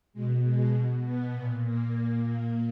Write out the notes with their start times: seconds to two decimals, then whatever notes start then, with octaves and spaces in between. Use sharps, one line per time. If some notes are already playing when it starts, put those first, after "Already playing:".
0.13 B2 G#3
0.43 G#3
0.73 B2
1.03 B3
1.33 A#2 B3
1.63 A#3